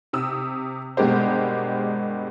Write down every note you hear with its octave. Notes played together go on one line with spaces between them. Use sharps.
C3 D#6 E6
G2 B2 G#3 A#3 G4 C5